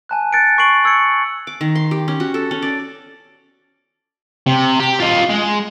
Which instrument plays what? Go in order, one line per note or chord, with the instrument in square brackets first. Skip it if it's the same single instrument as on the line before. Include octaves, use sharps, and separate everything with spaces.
[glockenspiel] G#5 A5 F#6
F#6 A6 C#7 D7
C#6 A6 C7 D7 F#7
C#6 E6 G#6 C#7
[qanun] D6
D#3
C6
G4
C#4
F#4
A4
C#4
D5
[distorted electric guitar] C3
G4
F4 D#5
G#3